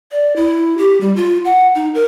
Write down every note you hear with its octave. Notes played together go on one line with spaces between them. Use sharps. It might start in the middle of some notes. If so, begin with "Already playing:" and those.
D5
E4
G4
G3
F4
F#5
D#4
A#4